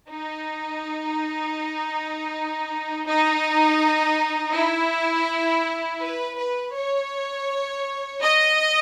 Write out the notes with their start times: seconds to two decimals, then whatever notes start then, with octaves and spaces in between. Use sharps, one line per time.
0.10 D#4
3.06 D#4
4.53 E4
6.01 B4
6.38 B4
6.75 C#5
8.22 D#5